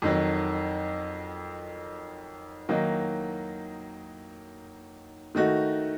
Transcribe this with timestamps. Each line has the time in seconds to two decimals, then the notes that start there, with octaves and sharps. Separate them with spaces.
0.02 F2 D#3 F#3
2.69 D#3 F#3 A#3 D#4
5.35 D#3 A3 D#4 F#4